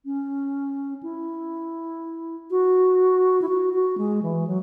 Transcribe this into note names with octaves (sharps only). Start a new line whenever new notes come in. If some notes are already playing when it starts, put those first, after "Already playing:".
C#4
E4
F#4
E4
F#4
F#4
G#3
E3
F#3